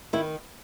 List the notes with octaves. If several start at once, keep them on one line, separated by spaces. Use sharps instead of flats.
D#3 E4